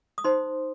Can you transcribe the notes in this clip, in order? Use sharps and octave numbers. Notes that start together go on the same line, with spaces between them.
D#6
D#4 C5 C6